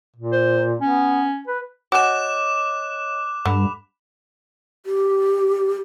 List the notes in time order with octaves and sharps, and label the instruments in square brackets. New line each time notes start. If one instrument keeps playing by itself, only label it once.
[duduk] A#2
[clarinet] C5
[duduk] B3 [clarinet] C#4
[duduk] B4
[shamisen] F#4 G#5 [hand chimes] C#5 D#5 [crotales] D6 F#6 E7
[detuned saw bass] G2 [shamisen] D3 [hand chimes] B5
[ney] G4